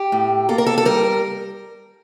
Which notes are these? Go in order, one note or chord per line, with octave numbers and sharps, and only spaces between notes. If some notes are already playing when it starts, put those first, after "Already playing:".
Already playing: G4
A2
A#3 A4
A#4
A4
A4
G3 A#4